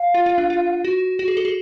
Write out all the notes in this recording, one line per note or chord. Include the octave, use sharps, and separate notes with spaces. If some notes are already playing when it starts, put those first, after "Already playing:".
Already playing: F5
F4
F4
D4
F4
F#4
F#4
G#4
A4
G#4